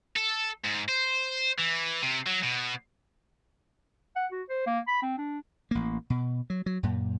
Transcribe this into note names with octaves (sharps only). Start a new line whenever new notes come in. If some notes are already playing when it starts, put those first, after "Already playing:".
A4
G#2
C5
E3
C3
F#3
B2
F#5
F#4
C5
A#3
B5
C4
D4
A1 A#3
B2
F#3
F#3
F#2 A#2